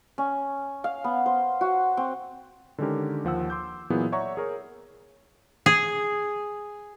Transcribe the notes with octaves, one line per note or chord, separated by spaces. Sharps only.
C#4
F5
B3
C5
F#4
C4
D3 D#3 G#3 C#4 G4 A#4
D#2 F3 F#5 E6
C6 D6 G6
A#2 E3 F#3 B3 E4 G#4
C#5 D5 E5 F#5 A#5 C#6
G#4 A#4 C#5
G#4